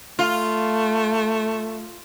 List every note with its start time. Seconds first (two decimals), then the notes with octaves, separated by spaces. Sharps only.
0.19 A3 F4